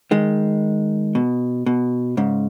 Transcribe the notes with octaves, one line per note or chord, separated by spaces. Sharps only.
D#3 G#3
B2
B2
G#2 C#3